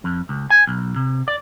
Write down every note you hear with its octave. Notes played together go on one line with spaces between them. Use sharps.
F2
C#2
G#5
B1
C3
D5